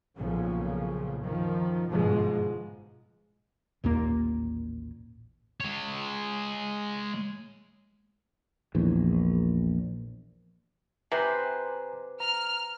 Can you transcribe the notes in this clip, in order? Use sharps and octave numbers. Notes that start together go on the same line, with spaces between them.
B1 A#2 C#3 F3
F#2 D#3 F3
G1 G#2 B2 F3 G#3
A1 D#2 A#2 A#3
G#3 C#5
A#1 E2
C3 B4 C5 G#5 A#5 D6
A#5 F6